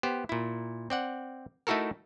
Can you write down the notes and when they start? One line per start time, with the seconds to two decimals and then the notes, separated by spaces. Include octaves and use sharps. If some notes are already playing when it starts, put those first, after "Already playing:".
0.03 B3 G4 C5
0.29 A#2 E4
0.90 C4 D5 F#5
1.67 A3 D#4 E4 F#4 A4 A#4